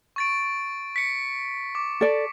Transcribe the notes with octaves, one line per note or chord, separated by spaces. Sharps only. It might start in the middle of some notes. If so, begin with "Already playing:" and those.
C#6 A6 D7
B6 C#7
D6
A4 D5